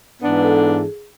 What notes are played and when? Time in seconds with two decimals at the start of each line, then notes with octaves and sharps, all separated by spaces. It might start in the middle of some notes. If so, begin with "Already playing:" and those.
0.21 G#2 E3 B3 D4 B4
0.43 A4
0.65 G#4